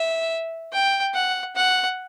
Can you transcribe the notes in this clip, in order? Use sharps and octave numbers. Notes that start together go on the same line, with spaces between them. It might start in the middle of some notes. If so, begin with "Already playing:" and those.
Already playing: E5
G5
F#5
F#5